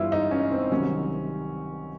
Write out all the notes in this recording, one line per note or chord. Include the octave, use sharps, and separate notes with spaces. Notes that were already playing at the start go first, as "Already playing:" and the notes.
Already playing: G1 G2 E3 G3 E4 F4
D#4
C#4
C4
C2 C3 D#3 F#3 C#4